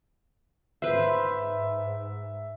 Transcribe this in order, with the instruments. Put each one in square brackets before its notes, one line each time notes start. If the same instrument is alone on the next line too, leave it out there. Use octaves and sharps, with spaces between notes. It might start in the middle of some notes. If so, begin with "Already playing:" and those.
[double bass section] G#2 [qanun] B4 C5 [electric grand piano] E5